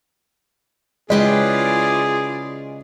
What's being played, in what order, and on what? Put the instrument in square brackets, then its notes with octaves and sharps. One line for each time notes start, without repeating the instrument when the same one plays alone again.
[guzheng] C#3 G4 B4 [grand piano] G#3 [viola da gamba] E4 F4 D5 [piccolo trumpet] G#4